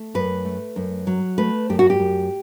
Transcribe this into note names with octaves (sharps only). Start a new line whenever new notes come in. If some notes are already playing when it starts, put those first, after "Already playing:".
Already playing: A3
F#2 B4
A3
F#2
F#3
A3 B4
F#2 G4
F#4
G4
F#2